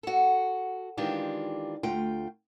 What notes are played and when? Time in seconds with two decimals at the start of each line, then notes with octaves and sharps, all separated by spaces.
0.03 F#4 A4
0.97 D#3 E3 G#3 D4 F4 G4
1.83 D2 A3 F4 G5